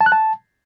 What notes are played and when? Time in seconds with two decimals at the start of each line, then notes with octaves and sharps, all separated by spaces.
0.01 A5
0.06 F#6
0.12 A5